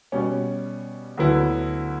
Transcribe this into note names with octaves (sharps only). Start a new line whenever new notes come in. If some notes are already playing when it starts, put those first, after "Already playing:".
B2 G3 C#4
D2 D3 F#3 B3 E4